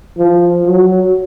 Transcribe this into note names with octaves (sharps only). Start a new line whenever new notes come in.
F3
F#3